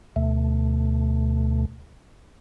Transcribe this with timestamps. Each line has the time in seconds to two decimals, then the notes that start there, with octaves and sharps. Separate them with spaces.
0.16 D2 B2 A3